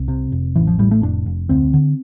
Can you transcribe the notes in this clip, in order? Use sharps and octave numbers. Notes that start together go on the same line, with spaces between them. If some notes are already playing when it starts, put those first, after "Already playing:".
Already playing: C2
C3
F1
A1 E3
F3
A2 G3
A3
F1 D4
F1
D2 C4
D3